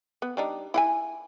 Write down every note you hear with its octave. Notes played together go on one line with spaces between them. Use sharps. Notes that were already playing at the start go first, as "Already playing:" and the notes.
B3
G3 D4 D#4
E4 F#5 G#5